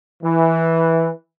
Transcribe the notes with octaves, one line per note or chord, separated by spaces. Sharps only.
E3